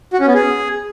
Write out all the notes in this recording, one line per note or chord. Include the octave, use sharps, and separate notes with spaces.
F#4
C#4
B3
G#4